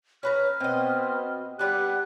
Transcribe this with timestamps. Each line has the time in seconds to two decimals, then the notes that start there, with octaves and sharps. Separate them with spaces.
0.23 C#4 B4 A#5 F6
0.60 B2 B3 C4 D#5
1.59 G3 B3 D4 G4 F#6